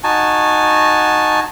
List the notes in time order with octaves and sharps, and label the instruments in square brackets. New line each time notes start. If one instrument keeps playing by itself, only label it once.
[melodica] D#4 F#4 G#5 A5